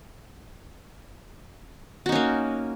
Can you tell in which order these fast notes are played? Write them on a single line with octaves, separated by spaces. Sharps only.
F#4 D#4 C#4 A#3